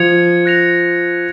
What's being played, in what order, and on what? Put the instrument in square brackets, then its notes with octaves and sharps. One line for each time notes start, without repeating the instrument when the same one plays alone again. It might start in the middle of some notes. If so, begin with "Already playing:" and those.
Already playing: [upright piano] F3 [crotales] G#6 C#7 F7
[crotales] F#6 A#6 C#7 F7